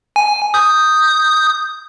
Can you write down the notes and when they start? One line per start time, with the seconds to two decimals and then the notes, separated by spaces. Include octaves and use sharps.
0.16 G#5
0.54 D#6 G6